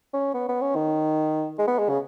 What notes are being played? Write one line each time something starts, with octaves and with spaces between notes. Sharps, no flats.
C#4
B3
B3
C#4
D#3
G#3
B3
G#3
C#3